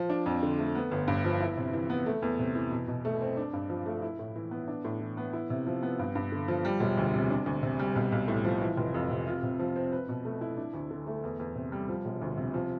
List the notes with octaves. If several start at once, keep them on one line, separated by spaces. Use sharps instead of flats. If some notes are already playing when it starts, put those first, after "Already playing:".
Already playing: F3
D4
F2
D3
A3
B3
G1
G2
F3
E4
C3
E3
B3
A3
E2
C3
E3
B2
B2
A3
C4
D4
G2
F3
A3
E4
A2
E3
B3
D4
A2
E3
B3
E4
C3
F3
B3
G2
G2
D3
F3
G3
E1
D2
C3
D4
D2
C3
G3
B1
B1
A2
F3
E3
F1
F2
C3
F4
C3
F3
C4
B4
B2
A3
E4
D4
D2
D3
A3
E2
E2
C3
G3
F3
E1
D2
C3
F3